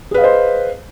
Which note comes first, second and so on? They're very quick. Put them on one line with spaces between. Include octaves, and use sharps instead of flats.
G#4 B4 F5 D#5 C5